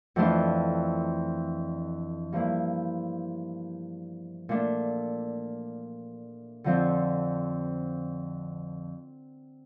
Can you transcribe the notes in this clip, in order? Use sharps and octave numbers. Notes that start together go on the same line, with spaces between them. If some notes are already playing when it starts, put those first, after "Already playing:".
F2 E3 A3 D4 F4
G2 F3 A#3 E4
A#2 A3 D4
F2 D3 F3 C4